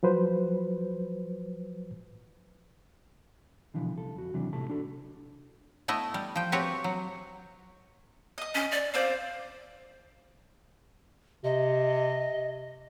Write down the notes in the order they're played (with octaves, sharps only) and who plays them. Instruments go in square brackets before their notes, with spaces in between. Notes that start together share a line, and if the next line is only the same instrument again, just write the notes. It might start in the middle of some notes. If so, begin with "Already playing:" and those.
[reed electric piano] F3 F#3 B4 C5
[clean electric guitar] B2 D3 E3 F3
C2 A4
F2 F#4
D#2 C3 E3 F#3 D4
A2 C3 A3 A5
D4 F#4 A4
[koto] A3 B3 E4 D#5
G3
F3 G5
C4 F#4 G4 B4 C#5
F#3
[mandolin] D#5 D#6
[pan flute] C#4
D5
[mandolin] C4 F4 D5 [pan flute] C5
[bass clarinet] C3 [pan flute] D#5